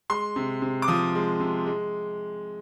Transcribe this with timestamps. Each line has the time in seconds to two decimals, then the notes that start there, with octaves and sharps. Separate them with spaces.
0.10 G#3 C6
0.36 C3
0.62 C3
0.82 D6
0.88 F3 D#6
1.15 G#3
1.40 C3
1.66 G#3